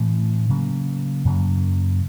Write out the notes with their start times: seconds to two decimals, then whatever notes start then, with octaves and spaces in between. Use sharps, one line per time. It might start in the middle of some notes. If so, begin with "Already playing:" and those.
Already playing: A2 E3 A3 C4
0.49 C#3 F#3 A#3
1.25 F#2 C#3 F#3 A#3